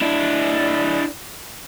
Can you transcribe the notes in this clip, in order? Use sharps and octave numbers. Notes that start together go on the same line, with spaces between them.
D4 E4